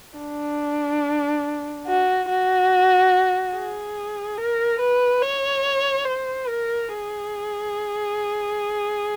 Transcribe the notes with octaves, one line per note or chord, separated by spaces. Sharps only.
D4
F#4
F#4
G#4
A#4
B4
C#5
C5
A#4
G#4